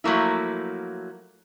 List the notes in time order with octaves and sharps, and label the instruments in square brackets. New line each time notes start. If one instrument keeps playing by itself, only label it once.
[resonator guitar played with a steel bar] F3 F#3 A3 A#3 E4